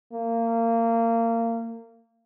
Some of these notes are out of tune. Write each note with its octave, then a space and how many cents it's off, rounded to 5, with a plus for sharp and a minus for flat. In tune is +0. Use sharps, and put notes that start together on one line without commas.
A#3 -25